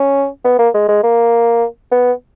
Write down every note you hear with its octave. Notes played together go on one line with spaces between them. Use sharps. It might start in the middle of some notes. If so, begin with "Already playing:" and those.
Already playing: C#4
B3
A#3
G#3
G#3
A#3
B3